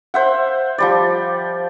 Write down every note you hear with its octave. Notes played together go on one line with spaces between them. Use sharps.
C5 E5 F#5
F3 G3 D5